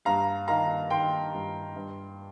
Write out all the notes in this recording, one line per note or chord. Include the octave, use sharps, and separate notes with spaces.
G2 F5 A#5
D#3 F5 A#5
D#3 G5 C6
G2
G2